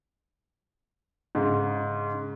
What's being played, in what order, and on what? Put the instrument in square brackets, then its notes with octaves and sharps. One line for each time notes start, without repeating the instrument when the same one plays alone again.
[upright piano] G#2 C#3